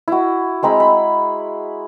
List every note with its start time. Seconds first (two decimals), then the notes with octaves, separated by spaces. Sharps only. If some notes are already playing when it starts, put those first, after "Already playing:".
0.08 E4 F#4
0.63 G#3 C4 A#5 B5
0.80 B5